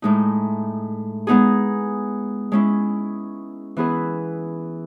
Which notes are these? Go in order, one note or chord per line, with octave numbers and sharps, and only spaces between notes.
A2 G#3 D#4
G#3 B3 D#4 G#4
G#3 C#4 E4
E3 B3 E4 G#4 B4